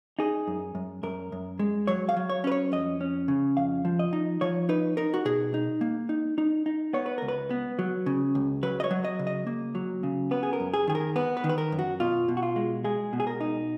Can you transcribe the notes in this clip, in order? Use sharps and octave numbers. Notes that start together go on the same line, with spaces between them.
D#4 G#4
F#2
F#2
F#2 A#4
F#2
G#3
F#3 C#5
F5
F#3
C#5
C#4 B4
C#5
F2 D#5
C#4
C#3
F2 F5
F3
D#5
D#4
F3 C#5
D#4 B4
D#4 A#4
F#4
B2 G#4
D#4
A#3
D#4
D#4
D#4
B3 C#5
B4
C#2 A#4
B4
B3
F#3
C#3
C#2
F#3 B4
D#5
C#5
F#3
D#5
C#3
D#5
A#3
F#3
C#3
B3 B4
G#4
A#4
F#2
G#4
D#3 G#4
A#4
B3 B4
B4
D#3
B4
A#4
F#2
F#4
B2 F4
B2
F#4
F4
G#3
G#3 G#4
B2
G#4
A#4
D#4